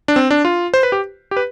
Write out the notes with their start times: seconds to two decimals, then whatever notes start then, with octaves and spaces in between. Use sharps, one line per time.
0.08 D4
0.16 C4
0.31 D4
0.45 F4
0.74 C5
0.83 B4
0.92 G4
1.31 G4
1.37 B4